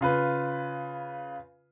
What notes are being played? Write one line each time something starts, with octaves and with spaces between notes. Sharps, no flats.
C#3 F4 B4